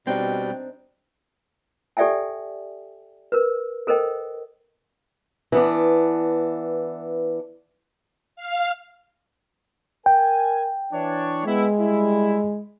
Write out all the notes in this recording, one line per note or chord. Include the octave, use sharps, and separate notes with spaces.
B2 G3 C4 D4 D#4 G5
G4 A4 D5 E5 G5 G#5
A#4 B4
A4 A#4 C5 D#5 G5
E3 B3 D4
F5
A#4 G5 G#5
E3 D4 C#5
G#3 B3 E4
G3 E4